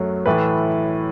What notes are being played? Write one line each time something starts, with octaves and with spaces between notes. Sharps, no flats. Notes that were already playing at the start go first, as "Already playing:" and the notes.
Already playing: F#2 F#3 A3
A2 E3 A3 B4